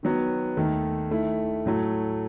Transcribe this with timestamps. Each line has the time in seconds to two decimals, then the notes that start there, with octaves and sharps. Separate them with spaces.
0.03 D#3 F#3 B3
0.57 D#2 D#3 A3
1.11 D#3 A3 E4
1.65 A2 F#3 A3